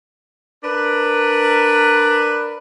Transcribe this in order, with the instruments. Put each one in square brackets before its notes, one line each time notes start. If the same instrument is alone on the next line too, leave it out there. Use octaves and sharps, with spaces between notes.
[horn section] D4 A#4 B4